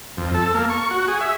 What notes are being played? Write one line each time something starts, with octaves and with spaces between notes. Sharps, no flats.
F2
A4
A#3
C#6
F#4
G#4
E5